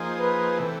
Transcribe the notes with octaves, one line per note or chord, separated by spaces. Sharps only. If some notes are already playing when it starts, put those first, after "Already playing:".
Already playing: F3 A#3 D#4 G#4 C5
B4
C3 E3 A3